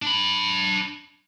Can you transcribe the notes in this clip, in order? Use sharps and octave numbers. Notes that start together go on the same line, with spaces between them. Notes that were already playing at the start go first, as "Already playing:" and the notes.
D4 B5